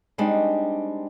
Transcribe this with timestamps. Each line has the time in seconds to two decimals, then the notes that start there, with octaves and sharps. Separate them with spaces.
0.18 G3 G#3 C4 D4 D#4